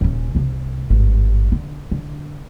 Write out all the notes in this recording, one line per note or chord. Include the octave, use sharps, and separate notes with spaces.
D#1 C#4
C2 C3
G#1 G2
D3
D3